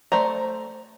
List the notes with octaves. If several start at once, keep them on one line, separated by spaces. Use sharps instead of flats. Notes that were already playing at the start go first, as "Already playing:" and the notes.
A3 C5 D5 A#5